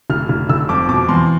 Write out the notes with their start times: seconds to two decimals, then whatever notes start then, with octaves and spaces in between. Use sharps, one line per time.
0.10 F1 F6
0.29 F1
0.49 F1 E6
0.69 F2 D6
0.89 B2 D6
1.08 E2 C6